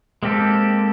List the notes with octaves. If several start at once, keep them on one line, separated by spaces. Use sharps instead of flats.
G#3 A#3 C4 G4 A4